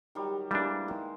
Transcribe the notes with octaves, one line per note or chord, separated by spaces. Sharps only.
D#3 F#3 G3
E3 G3 G#3 A#3 D4
D#3